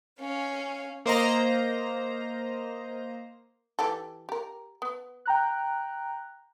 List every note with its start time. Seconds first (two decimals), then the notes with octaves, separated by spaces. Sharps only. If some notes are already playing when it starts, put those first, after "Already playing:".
0.19 C#4 F5
1.06 A#3 C5 D#5 A#5
3.79 E3 G4 A4
4.29 G4 A#4
4.82 B3
5.26 G5 A#5 F#6